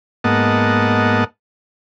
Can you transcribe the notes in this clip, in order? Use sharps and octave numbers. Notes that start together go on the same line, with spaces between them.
G#2 A#3 B3 D#5 F#5 A5